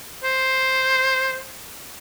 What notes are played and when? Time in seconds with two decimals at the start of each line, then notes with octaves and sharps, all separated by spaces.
0.24 C5